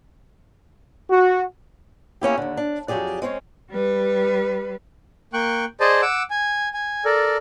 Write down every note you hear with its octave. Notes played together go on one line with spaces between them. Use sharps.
F#4
A#3 C#4 E4 G4
D#2 D3
D4
F2 F#3 G4 G#4 D5
G#3 C4 C#4 C#5
G3 B4
A#3 G5 C#6 F#6
G#4 C5 D5 D#5 A5
F#5 D6 E6
G#5
G#5
A4 A#4 D5